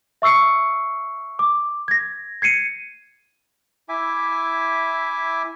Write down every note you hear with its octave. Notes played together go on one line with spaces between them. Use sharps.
E5 C#6 E6 C7 C#7
D6
G#6 A#6
G#6 C7 C#7 D#7
E4 E5 G#5 D6